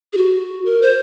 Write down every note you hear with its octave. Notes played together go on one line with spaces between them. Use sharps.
G#4
F#4
A#4
C5